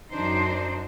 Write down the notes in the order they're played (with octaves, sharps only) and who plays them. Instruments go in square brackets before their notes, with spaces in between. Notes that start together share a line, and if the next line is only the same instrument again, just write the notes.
[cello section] F#2 D4 D#4 C5